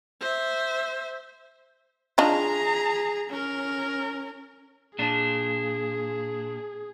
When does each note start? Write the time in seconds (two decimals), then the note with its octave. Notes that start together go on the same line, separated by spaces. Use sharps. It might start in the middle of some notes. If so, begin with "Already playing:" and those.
0.21 C5 E5
2.18 D4 D#4 F4 G#4 A#5
3.29 C#4 A#4
4.99 A#2 D4 G#4